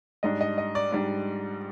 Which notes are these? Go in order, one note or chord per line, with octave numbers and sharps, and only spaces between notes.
G#2 G3 D4 D#5
D#5
D#5
D5
G#2 G3 D4 D5